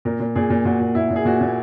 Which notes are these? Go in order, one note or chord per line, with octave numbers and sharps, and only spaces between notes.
A#2 A#4
A#2
A#2 G#4
A#2
A#2 F#4
A#2
A#2 E4
A#2
G#4
A#2 F#4
A#2